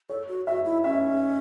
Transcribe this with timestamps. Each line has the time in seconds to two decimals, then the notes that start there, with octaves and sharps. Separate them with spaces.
0.09 A4 C#5
0.28 F#4
0.47 F#4 E5
0.65 E4
0.84 C#4 E5